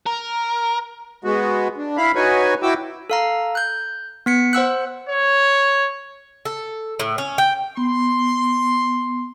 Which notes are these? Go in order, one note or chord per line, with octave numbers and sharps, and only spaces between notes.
A#4
G#3 B3 F#4
D4
E4 F5 B5
D#4 F#4 B4 C#5 G#5
E4 F#4 G5 D6 E6
A4 F5 A#5
F#6 G6
B3 B6 C#7
C5 F#5 E6 F#6
C#5
A4
A2
C#4
G5
B3 C6